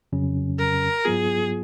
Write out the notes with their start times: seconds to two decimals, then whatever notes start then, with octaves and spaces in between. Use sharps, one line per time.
0.13 F2 C#3 F#3 C#4
0.59 A#4
1.05 G#2 F#3 B3 F4 G#4